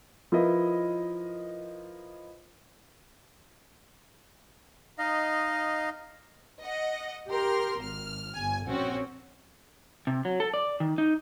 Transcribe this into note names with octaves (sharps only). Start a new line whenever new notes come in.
F3 E4 F4 A#4 B4 D#5
D#4 D#5 F5
D#5 F#5
G4 A#4 C6 F6
G#1 F6
G1 G#5
A#1 C4 C#4 F#4 C#5
C3
F#3
A4
D5
D#3
D#4